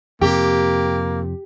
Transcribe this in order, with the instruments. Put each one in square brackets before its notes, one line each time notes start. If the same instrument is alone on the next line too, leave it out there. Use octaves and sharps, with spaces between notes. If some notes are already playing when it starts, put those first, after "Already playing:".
[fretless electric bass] F2 C3 [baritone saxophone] A#3 [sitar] G4